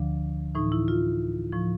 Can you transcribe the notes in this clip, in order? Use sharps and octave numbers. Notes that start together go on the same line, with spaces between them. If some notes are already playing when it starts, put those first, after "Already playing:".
Already playing: D2 D3 F3 D4
A2 E3 D#4
E4
F4
A2 F3